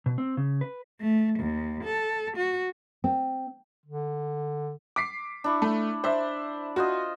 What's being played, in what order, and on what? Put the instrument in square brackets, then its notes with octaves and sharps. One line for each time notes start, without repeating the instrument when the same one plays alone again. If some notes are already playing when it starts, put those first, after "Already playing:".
[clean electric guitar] B2
C4
C#3
B4
[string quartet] A3
D#2
A4
F#4
[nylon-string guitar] C4
[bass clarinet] D3
[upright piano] D6 B6 C7
[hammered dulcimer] D4 E4 C#6
[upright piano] A3
[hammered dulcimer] D4 [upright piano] C5 E5
[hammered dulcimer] F4 C5 D#5 [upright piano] F#4